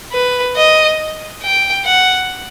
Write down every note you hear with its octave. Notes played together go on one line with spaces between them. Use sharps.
B4
D#5
G5
F#5